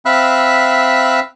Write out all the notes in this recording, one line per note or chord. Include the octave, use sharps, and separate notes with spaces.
C4 E5 F5 B5 E6 F#6